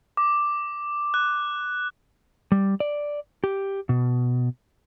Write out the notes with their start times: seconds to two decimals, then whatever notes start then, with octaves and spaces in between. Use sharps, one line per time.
0.17 D6
1.14 F#6
2.52 G3
2.80 D5
3.44 G4
3.89 B2